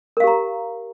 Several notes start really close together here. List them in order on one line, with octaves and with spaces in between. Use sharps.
A#4 F5 G4 A#5